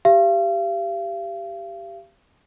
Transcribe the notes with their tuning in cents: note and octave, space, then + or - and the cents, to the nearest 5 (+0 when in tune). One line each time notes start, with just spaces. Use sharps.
G4 +0 F5 -40